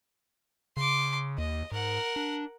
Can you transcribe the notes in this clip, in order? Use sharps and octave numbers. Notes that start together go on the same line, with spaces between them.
C#3 C6 D6
D#2 D#5
G#2 A#4 F#5
D4